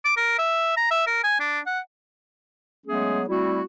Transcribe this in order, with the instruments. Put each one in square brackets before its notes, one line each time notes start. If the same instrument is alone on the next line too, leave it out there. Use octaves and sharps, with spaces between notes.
[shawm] D6
A#4
E5
A#5
E5
A#4
G#5
D4
F#5
[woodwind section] F#3 G#3 A3 B3 C#4 G#4
G3 A3 C4 E4 F#4